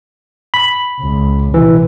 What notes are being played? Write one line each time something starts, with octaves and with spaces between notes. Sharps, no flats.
B5
C#2
A#1 C3 E3